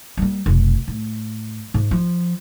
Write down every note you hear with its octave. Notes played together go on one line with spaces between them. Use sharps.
G3 A#3
F1 B1
A2
G#2
F3